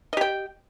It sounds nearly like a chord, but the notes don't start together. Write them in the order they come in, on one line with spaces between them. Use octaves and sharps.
D#5 G4 G5